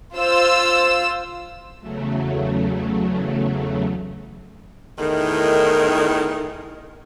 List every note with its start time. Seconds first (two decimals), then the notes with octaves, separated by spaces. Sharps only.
0.16 F4 C5 E6
1.80 E2 C#3 F#3 A3
4.99 E2 A2 D#3